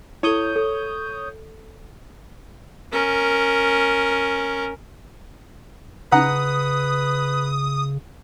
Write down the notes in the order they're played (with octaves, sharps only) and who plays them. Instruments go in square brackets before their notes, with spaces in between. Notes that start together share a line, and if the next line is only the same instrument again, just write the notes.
[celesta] E4 A4 [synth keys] C#5 D#6 G6
[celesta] A4
[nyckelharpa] C#4 A#4
[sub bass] C#3 [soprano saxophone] B4 [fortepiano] F#5 A#5 [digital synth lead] D#6